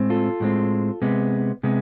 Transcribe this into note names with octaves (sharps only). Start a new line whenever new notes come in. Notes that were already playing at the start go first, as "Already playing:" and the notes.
Already playing: A2 G#3 C4
F4 A4
A2 G#3 C4
C3 G#3 B3
C3 G#3 B3